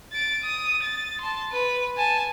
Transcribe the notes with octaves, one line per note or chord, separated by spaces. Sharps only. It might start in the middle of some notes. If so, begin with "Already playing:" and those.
A6 D7
D#6
A6
A5 C6
B4
G#5 A5